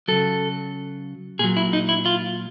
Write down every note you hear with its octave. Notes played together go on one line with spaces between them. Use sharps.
C#3 F#3 A4
A#2 F#3 G#4
E4
D#4
E4
F4